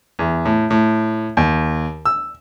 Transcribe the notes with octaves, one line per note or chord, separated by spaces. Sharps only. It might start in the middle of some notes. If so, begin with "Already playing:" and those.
E2
A2
A2
D#2
E6